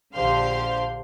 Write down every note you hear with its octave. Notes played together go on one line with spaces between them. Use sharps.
A#1 D3 G4 C5 F5 C6